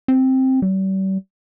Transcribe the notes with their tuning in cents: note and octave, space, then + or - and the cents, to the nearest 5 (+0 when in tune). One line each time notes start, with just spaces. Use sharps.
C4 +5
G3 -40